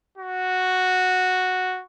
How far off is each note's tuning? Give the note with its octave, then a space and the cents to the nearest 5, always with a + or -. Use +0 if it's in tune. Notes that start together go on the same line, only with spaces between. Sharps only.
F#4 -5